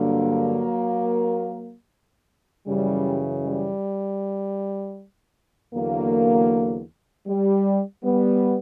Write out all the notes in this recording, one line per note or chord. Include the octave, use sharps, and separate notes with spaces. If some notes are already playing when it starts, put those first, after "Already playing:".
Already playing: G2 D3 F#3 A#3
F#2 C#3 E3 G3
G3
E2 D3 F#3 A#3
G3
G3 B3